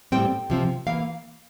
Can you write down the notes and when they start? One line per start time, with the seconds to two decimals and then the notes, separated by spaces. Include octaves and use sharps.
0.12 A2 G3 C4 G5
0.50 C3 F3 C4
0.87 E3 A#3 F5